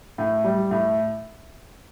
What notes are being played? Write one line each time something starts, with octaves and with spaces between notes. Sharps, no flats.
A2
G3
A2